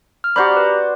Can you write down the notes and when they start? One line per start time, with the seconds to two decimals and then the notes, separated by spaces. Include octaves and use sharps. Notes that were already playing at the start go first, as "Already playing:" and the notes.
0.24 F6
0.36 F#4 G4 C5 D5 A#5 B5
0.57 B4